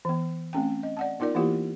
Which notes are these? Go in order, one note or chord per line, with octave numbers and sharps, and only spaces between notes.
E3 B3
A3 C4 C#4 G5
D#5
D5 F#5 A5
B3 D#4 F4 A#4 D5
E3 A#3 B3 E4 F4 G4